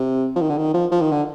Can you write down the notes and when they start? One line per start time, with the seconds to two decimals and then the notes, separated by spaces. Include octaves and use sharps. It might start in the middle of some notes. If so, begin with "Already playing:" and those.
Already playing: C3
0.36 F3
0.41 D#3
0.50 D3
0.58 D#3
0.74 F3
0.91 F3
1.01 D#3
1.12 D3